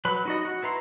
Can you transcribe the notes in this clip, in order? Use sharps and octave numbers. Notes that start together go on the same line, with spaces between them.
F#3 B4 B5
D#4 F#4 D#5
F#4
E4 B4 A#5 C6